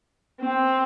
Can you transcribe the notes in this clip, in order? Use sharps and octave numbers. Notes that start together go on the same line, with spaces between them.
C4